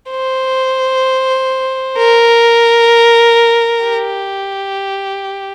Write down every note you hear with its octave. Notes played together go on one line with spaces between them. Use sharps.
C5
A#4
G4